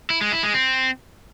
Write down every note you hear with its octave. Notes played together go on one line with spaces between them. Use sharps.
E4
G#3
E4
G#3
C4